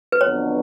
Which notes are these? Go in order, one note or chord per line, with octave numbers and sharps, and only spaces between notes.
B4
F2 D3 F#3 B3 D4 C#5